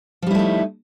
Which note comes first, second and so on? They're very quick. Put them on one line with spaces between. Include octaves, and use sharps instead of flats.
F3 G3 E4 A3 D#4